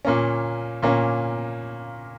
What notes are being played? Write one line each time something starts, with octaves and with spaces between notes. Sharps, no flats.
A#2 A#3 C#4
A#2 A#3 C#4